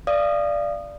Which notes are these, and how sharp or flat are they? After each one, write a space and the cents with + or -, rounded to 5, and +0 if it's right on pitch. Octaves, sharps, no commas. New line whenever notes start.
D5 +0 F5 -30 D#6 -20